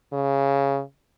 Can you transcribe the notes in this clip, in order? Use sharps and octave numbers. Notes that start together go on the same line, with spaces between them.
C#3